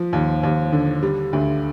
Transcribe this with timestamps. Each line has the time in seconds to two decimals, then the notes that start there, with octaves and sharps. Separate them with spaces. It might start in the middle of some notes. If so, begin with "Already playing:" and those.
Already playing: F3
0.13 D#2
0.43 D#2
0.72 D3
1.03 G3
1.33 D2